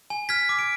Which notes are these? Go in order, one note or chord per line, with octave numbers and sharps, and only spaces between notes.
G#5
F6 G#6 B6
D6
D7